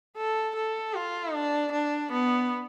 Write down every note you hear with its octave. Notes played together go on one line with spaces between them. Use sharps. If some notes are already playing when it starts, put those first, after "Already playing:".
A4
A4
F4
D4
D4
B3